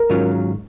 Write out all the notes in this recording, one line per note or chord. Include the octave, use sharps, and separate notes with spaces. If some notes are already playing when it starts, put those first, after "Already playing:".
Already playing: A#4
G#2 D#3 F#3 C#4 F4